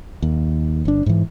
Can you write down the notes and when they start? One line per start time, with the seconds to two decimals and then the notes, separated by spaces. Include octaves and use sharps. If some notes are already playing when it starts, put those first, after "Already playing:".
0.22 D#2
0.85 G1 D4
1.06 G#2 E3